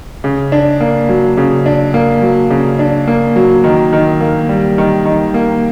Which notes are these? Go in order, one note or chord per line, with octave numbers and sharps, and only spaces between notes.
C#3
D4
A#3
F#3
C#3
D4
A#3
F#3
C#3
D4
A#3
F#3
D#3
D#3
A#3
G3
D#3
D#3
A#3